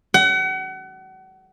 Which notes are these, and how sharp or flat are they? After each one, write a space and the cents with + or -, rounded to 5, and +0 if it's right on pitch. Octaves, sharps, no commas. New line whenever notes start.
F#5 +35